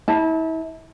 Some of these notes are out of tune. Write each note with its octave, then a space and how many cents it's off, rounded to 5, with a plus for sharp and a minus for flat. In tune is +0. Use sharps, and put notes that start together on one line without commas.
E4 -35 A5 +0